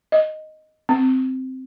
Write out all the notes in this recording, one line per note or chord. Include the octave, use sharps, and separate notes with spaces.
D#5
C4